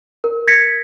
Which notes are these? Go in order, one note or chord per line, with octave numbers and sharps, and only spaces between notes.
A#4
G#6 A#6 B6 C#7